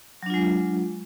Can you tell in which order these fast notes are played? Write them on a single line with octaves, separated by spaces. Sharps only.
F#3 D4 F4 G#3